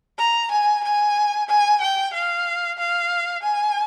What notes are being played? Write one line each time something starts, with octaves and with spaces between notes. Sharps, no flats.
A#5
G#5
G#5
G#5
G5
F5
F5
G#5